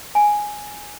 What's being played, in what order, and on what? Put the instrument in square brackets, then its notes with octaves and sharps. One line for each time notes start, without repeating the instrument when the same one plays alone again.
[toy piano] G#5